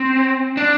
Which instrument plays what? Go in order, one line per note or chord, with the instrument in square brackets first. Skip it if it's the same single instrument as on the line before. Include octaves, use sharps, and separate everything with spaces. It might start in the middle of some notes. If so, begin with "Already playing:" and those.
Already playing: [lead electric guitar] C4
D4